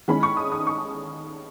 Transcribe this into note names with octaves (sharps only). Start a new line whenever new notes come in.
D#3 G#3 C#4 E4 B5
C#6
D#6
D#6
C#6